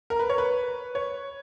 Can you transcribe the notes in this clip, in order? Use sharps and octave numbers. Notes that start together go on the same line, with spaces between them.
A#4
B4
C#5
B4
C#5